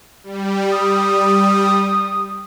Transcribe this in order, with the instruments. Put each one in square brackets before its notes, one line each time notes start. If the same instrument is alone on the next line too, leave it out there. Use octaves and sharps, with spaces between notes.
[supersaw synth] G3
[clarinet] D#6